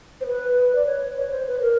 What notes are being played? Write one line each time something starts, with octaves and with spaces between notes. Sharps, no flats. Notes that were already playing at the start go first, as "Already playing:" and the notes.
C5
B4
D5
C#5
C#5
C5
B4
A#4